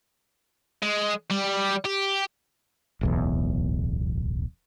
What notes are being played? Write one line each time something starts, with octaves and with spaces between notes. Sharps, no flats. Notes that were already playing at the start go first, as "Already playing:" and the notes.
G#3
G3
G4
D1 B1 E2